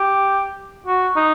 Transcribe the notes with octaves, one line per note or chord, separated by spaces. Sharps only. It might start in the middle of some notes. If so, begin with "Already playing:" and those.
Already playing: G4
F#4
D#4